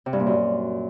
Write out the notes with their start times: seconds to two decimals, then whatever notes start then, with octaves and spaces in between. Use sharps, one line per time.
0.06 C3
0.13 G2
0.20 A#2
0.26 F#2